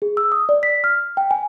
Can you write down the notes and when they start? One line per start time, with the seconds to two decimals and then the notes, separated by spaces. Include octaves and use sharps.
0.02 G#4
0.17 E6
0.32 D#6
0.49 D5
0.63 B6
0.84 F6
1.17 G5
1.31 G#5